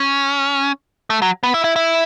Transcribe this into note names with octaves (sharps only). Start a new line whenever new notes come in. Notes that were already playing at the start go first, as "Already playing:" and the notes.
Already playing: C#4
A3
F#3
B3
E4
E4
E4